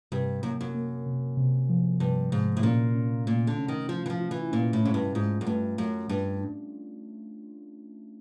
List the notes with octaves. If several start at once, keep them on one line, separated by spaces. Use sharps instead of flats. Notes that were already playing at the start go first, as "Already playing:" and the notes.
G2 C3
F#2 A#3
F#2
A#3
C3
C3
F3
G2 C3
G#2 C3
A2
A#2 C#4
C#4
A#2 A3
D3
C#4
D#3
F3 F4
E3
F3
F4
E3
A#2 C#4
A2
G#2 C#4
G2
G#2 F4
F#2
G2 A3
F#2 A3
G2 D4
D4